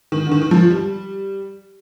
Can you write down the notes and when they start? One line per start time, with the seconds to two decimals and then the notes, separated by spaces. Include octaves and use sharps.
0.12 D#3
0.26 D3
0.31 D#3
0.42 D#3
0.51 F3
0.70 G3